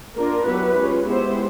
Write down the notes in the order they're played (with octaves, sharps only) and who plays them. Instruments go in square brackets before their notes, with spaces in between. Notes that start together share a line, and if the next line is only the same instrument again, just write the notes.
[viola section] A#3 D4 F4 A#4
F#3 B3 E4 G4 B4
G#3 C#4 F4
G#3 B3 E4 G4 C5